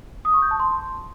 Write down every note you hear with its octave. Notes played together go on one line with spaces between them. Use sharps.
D#6
C#6
G6
A5
C6